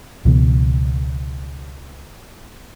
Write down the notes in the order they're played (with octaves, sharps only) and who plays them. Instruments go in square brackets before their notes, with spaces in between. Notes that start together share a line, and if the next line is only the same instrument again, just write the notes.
[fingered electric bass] C#2 B2 E3